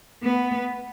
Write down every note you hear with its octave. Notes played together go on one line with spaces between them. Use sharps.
B3